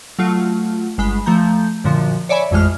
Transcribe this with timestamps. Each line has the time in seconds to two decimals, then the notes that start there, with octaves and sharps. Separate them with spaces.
0.19 F#3 A3 F4
0.98 G1 G#3 B5
1.26 F3 A3 A#5 G6
1.84 F#2 A#2 D3 F3
2.29 C#5 D5 E5 G#5 B5
2.51 A1 F2 E3 G#3 F6